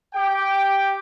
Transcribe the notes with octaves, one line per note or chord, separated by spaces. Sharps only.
G4 G5